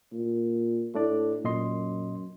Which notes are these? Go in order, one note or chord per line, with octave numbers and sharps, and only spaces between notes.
A#2
A2 A3 D4 D5
F#2 A#2 D#5 C6